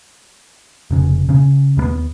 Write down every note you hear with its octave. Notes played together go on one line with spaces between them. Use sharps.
F1 C#3
C#3 C#4
D#2 G3 B3